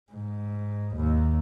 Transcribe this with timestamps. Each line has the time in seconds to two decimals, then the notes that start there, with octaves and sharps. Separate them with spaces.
0.12 G#2
0.96 D#2